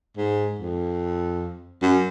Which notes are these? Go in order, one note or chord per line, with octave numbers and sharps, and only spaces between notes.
G#2
F2
F#2